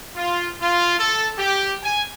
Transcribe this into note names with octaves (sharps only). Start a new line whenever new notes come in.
F4
F4
A4
G4
G#5